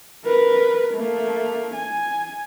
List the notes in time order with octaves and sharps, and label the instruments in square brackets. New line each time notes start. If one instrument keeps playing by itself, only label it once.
[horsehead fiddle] A#4 B4
A3 A#3
G#5